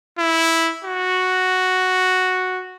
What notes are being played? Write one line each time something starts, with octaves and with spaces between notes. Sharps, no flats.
E4
F#4